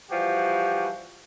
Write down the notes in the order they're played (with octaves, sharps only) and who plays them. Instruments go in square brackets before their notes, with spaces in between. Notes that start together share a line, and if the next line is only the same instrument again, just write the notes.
[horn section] E3 F3 G3 F#4 G4